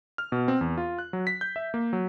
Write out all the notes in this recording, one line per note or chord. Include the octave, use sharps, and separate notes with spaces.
F6
B2
C4
E2
F4
F#6
F#3
B6
G6
E5
A#3
F#3